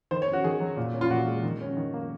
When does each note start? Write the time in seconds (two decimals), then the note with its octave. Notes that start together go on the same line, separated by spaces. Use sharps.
0.11 D#3 C5
0.22 C#5
0.28 C#4
0.33 F#4
0.44 D#3 G#4
0.60 F#3
0.77 A#2
0.94 C#4
1.01 F4
1.10 A#2 F#4
1.27 G#3
1.43 D#3
1.61 C#4
1.77 D#3
1.93 A#3